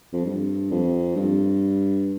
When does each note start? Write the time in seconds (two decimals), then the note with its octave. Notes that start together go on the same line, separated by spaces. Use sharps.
0.13 F2
0.26 G2
0.71 F2
1.16 G2